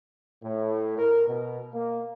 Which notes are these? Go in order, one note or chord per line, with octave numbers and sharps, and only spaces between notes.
A2
A#4
B2
A#3